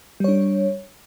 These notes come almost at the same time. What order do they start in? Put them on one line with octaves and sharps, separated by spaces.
G3 C#5 D4